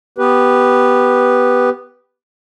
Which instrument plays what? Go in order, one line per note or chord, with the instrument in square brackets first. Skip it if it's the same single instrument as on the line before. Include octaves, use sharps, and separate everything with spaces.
[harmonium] B3 G4 B4